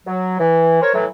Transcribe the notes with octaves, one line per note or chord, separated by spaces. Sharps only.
F#3
E3
A#4 C5 C#5
A2 E3 F#3